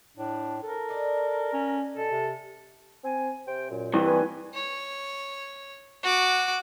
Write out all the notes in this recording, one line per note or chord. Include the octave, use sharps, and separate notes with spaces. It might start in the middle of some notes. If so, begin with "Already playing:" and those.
A2 D4
A4 A#4
D4 D#4
C#4
B2 A4
C3
C4 G#5
C3 C5 G5
F#2 A#2
G2 E3
B4 G#5
C#5
F#4 D6